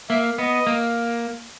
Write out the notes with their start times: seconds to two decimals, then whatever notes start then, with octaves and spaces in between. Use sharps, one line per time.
0.09 A#3 E5
0.38 B3 D#5
0.67 A#3